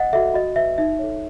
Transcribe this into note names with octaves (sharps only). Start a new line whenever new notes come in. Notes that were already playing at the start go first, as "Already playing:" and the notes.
Already playing: D#5 F#5
F#4 A4 E5
F#4 D#5
B4 E5
D#4 E5
A4 C#5